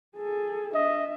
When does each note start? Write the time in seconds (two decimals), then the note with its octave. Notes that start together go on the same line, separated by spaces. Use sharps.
0.17 G#4 A4
0.74 D4 D#5 E5